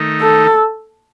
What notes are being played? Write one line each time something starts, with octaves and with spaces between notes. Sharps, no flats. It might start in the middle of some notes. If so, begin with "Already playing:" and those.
Already playing: D#3 A3 D#4
A4